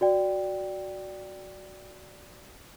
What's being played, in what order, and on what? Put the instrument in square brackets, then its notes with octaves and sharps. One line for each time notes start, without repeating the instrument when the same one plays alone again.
[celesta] F#4 D5 G5